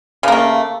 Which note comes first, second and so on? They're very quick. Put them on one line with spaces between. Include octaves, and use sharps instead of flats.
C#3 A#3 A3